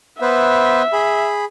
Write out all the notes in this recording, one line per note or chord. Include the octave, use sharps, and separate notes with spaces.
B3 B4 C5 E5
G#4 B5